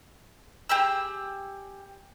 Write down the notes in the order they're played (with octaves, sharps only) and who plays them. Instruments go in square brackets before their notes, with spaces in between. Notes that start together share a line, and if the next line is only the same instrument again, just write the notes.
[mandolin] G4 G#4 B5 E6